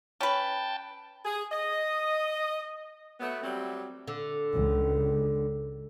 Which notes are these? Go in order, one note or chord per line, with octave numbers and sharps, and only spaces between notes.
C#4 B4 G5 A5
G#4
D#5
F#3 A3 B3
F#3 G3 A3 C4
D3
C#2